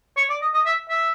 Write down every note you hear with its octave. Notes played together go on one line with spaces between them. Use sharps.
C#5
D5
D#5
D#5
E5
E5